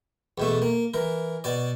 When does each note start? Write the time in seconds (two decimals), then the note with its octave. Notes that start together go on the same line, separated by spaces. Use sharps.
0.38 E2 B2 A3
0.62 A#3
0.94 E3 A#4
1.44 B2 D5